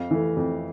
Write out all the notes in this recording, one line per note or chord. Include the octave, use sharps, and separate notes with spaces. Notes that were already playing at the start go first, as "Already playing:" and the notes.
Already playing: F2 F5
E3 A3
F2